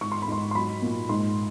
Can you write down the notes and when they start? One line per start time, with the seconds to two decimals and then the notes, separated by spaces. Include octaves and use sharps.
0.01 G#2 C#6
0.12 C6
0.22 B5
0.28 G#2 C6
0.51 C6
0.55 F#3 B5
0.82 A#2
1.09 G#2 C6